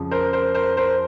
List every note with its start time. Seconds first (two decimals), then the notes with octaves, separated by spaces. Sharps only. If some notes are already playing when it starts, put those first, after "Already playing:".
Already playing: F2 C#3 F3
0.11 A#4 C5
0.33 A#4 C5
0.55 A#4 C5
0.77 A#4 C5